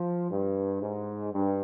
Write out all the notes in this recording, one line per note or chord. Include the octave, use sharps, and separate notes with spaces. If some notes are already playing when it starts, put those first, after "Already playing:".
Already playing: F3
G2
G#2
G2